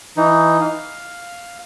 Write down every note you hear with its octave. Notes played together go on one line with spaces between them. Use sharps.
E3 D#4
F5